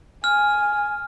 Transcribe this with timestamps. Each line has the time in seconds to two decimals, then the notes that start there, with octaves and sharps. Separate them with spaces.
0.24 G#5 F6